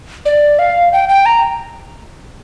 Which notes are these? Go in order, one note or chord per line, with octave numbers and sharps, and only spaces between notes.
D5
F5
G5
G5
A#5